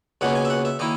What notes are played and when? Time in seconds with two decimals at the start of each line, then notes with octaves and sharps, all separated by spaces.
0.21 C#2 B2 A#3 C#4 F#5
0.35 G#5
0.45 E5
0.50 F#5
0.65 E5
0.79 D#3 A#3 E4 D#5